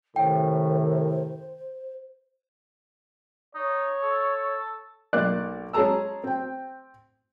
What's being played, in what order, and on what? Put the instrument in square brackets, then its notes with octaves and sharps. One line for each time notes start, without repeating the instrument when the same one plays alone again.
[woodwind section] F#2 C3 D#3 [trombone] A2 [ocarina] C5 [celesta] G5
[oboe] D#4 [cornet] C#5
[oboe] A4
[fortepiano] B1 A#3 D5 D6 F#6
G#3 C#4 G#4 A5 A#5 E6
C4 G5